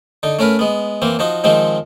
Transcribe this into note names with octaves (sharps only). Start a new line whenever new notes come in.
D3 D#4
A3 C#4 A#4 B4
G#3 B3
E3 A#3 C4
F3 D#4 F#4
D#3 F3 G#3 C4 D#4